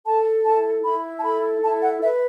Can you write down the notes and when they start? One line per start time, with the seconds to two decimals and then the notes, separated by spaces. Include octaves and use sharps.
0.06 A4 A5
0.45 E4 A5
0.83 E4 B5
1.18 A5
1.23 A4 B5
1.62 E4 A5
1.82 F#5
2.01 B4 E5